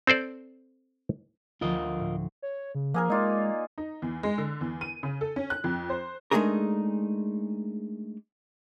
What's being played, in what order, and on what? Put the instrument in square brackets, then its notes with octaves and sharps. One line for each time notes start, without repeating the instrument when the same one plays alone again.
[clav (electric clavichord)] C4 A4 C5 D5
[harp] D2 F3 [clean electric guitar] F4 A#4 D#5
[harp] A2
[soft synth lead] C#5
C#3
[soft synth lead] F3 [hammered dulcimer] A#3 G#4 A#4
[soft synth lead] G#3 [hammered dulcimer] D#4 F4 D5
[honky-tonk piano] D#4
E2
G#3
D3
E2
D#7
C#3
A4
C#4
F#6
F2
C5
[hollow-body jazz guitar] G#3 A3 D4 D#4 G#4 A#4